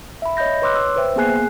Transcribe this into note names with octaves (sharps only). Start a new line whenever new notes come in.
E5 B5
C#5 D#5 B5 G6 A#6
B4 C#5 C6 D6 E6 F#6
E6
B4 C5 E5 G5
A#3 B3 G#4 G#5 F#6 C7